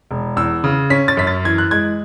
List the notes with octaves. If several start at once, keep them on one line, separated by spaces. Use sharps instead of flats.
E1
E2 E6
C#3
C#4 B6
A6
F#2 B6
A6
E3 G#6
F#6
G#3 G#6